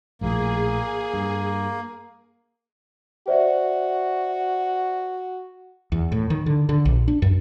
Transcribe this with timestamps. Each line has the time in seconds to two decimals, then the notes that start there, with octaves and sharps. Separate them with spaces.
0.21 A#1 A2 F3 A#3 G#4
1.14 G2
3.28 F#4 C5 D5 E5
5.92 E2
6.12 A2
6.30 D#3
6.46 D3
6.69 D3
6.85 A#1
7.08 D4
7.22 F#2